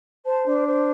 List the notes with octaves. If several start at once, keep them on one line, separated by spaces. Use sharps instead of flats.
C5 A5
D4
C5